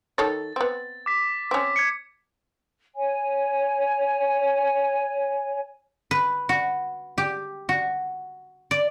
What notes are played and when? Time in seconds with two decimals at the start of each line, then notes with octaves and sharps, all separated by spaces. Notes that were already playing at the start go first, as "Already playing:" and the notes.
0.18 D#3 A4 C#5 A6
0.56 B3 C4
1.06 D6 B6
1.51 C4 C#4
1.76 G#6 C#7
2.94 C#5 G#5
6.11 B4
6.49 F#4
7.18 G4
7.69 F#4
8.71 D5